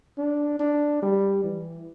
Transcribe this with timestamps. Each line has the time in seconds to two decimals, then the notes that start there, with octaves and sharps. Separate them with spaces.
0.18 D4
0.60 D4
1.03 G3
1.44 E3